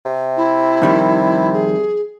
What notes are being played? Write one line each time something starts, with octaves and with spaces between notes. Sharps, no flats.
C3
E4
F2 D#3 G3
G#4